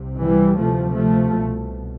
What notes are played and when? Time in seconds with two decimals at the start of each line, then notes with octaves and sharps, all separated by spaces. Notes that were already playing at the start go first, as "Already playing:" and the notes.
Already playing: C2 C3
0.19 E3 G3
0.57 D2 C3 F3 A3
0.95 F3 A3
1.34 C2 B2